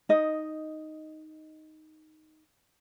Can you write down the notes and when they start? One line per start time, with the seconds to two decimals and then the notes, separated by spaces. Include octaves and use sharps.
0.09 D#4 D#5